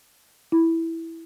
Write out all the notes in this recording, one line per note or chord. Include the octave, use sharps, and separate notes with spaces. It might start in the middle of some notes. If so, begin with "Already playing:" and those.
E4